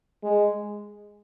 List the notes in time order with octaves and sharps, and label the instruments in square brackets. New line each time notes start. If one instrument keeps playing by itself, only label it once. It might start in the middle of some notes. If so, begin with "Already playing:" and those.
[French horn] G#3